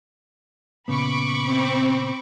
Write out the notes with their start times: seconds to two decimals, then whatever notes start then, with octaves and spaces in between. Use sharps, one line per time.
0.88 A#2 C#3 B3 B5 C#6 D6
1.44 C4